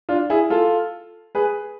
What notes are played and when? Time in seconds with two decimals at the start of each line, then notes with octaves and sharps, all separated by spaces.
0.09 D4 F4
0.30 E4 G#4
0.50 F4 A4
1.35 G#4 B4